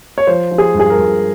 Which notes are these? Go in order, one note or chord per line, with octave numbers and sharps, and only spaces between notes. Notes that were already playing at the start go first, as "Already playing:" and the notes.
C#5
F3 C5
F3
G#4
G2
G#4
A#4
G2